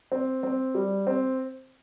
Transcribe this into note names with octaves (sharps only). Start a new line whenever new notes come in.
C4
C4
G3
C4